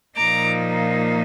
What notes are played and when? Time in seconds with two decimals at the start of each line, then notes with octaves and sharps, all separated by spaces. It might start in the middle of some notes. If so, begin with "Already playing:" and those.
0.16 A#2 F3 A#3 D#4 A#5 D6